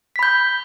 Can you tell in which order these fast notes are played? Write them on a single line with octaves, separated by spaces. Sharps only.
B6 B5 G6